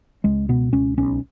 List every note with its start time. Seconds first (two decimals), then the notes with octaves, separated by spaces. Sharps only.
0.24 C#2 G#3
0.49 B2 B3
0.73 C#2 C#4
0.98 B1 C#4